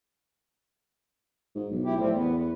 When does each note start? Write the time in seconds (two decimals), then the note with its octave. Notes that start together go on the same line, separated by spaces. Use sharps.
1.55 G#2
1.71 B1
1.85 E4 G4
1.98 A2 F3 G3 C4
2.15 E2 B3
2.36 B3